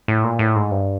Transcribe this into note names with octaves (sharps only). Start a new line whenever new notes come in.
A2
A#2
A2
G#2
G2